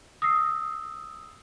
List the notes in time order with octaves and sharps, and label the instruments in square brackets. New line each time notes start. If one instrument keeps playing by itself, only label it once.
[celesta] D#6 E6 A#6 C7